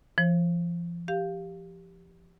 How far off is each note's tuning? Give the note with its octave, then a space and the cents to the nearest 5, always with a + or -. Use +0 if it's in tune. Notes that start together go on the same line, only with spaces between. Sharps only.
F3 -35 C5 +35
G4 +0 F5 +0